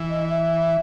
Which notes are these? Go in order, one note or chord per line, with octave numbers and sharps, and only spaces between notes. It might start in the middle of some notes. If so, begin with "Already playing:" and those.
Already playing: E3
D#5
E5